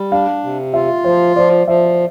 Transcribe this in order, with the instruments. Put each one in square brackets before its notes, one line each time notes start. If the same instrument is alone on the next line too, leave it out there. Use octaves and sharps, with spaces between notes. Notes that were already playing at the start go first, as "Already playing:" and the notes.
Already playing: [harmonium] G3
[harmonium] D4 [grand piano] F5
[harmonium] C3
[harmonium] F4 [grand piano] E5
[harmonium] F3 [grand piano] C5
[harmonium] F3 [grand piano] D5
[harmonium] F3 [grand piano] E5